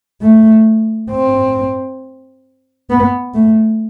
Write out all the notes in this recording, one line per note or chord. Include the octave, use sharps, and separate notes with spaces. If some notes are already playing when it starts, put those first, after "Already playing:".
A3
C4
B3
A3